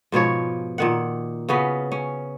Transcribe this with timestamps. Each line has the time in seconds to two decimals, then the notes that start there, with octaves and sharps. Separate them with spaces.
0.12 G#2 B2 F3 C#5
0.78 A#2 D#3 F#5
1.49 C#3 B3 C#4 F#4
1.92 C#4